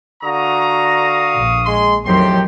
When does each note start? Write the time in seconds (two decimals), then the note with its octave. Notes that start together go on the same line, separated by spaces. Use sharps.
0.23 D3 F#4 F5 A#5 C#6 D#6
1.34 A#1
1.64 G#3 C6
2.05 F2 A2 D#3 F#3 G4 A#4 G5 C6